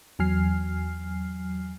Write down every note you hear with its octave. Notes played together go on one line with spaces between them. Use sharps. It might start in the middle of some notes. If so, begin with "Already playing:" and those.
E2 F#3 G#5 F6 C7